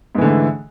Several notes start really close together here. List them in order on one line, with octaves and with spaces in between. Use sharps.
G#2 E3 D3 A3